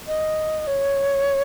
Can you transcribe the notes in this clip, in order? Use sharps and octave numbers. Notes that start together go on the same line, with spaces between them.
D#5
C#5